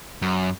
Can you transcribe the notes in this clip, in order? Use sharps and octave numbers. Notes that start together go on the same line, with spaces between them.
F#2